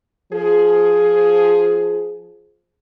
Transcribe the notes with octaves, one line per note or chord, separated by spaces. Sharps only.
F3 G#4